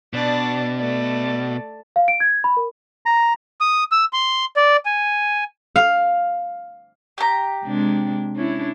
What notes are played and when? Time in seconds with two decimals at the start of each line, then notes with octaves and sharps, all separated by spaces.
0.13 B2 D4 D5
0.79 A3 D5
1.96 F5
2.08 D7
2.20 G#6
2.44 B5
2.57 A#4
3.06 A#5
3.61 D#6
3.92 E6
4.13 C6
4.57 D5
4.86 G#5
5.76 F5
7.18 G4 A#5
7.64 C3 G#3 D4
8.36 C#4 D4 E4